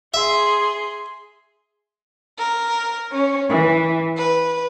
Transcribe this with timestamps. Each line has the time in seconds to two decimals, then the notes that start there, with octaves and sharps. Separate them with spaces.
0.14 G#4 E5 C6
2.38 A#4
3.11 C#4
3.49 E3
4.17 B4